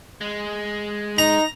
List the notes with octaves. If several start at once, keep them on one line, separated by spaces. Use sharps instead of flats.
G#3
D#4 A#5